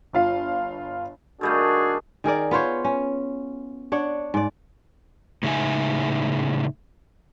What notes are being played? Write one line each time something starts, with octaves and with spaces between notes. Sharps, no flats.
G1 F4 F5
D#3 G3 A3 D4 F#4 G#4
D#3 G#4 A#4 D5
B3 F4 C5 C#5
C#4
D4 C#5 F#5
G#2 D5
A2 C#3 G#3 D#4 E5 G#5